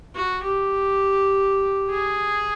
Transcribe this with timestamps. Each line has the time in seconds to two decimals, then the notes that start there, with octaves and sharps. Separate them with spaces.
0.15 F#4
0.43 G4
1.90 G#4